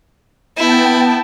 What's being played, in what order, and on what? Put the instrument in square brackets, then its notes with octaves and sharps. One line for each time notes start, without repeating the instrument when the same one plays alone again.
[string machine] B3 G5 A5 [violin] E4